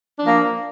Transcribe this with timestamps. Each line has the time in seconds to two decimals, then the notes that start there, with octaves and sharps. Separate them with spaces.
0.19 D4
0.22 F3
0.25 A#3